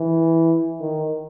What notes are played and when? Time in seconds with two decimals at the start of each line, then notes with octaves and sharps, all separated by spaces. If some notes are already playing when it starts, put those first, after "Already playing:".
Already playing: E3
0.81 D#3